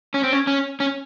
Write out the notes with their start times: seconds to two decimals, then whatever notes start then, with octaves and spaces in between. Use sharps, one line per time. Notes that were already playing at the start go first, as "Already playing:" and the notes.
0.14 C#4
0.24 C4
0.33 C#4
0.47 C#4
0.80 C#4